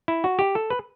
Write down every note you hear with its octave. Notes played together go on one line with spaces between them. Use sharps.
E4
F#4
G4
A4
B4